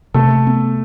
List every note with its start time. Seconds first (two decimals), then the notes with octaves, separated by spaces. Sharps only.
0.14 C3 A3 A4
0.47 B3